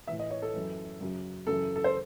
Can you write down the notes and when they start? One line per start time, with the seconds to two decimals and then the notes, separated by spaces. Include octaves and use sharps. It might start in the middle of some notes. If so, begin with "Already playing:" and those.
0.07 A2 E3 E5
0.19 D#5
0.31 C#5
0.42 A4
0.54 F#2 E3
1.01 F#2 C#3 F#3
1.47 F#2 C#3 E3 A4
1.76 A4
1.84 C5